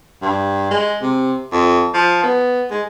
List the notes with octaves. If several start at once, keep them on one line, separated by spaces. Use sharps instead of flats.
G2
G#3
C3
F2
F3
B3
G#3